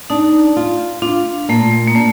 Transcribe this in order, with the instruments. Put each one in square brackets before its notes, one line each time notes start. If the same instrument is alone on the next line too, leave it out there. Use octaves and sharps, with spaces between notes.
[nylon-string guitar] D4 [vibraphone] D#4
[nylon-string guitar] F4
[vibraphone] D4 [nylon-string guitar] F4
[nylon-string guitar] A#2 [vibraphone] A3
[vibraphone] A#3
[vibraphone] A3 [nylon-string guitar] D4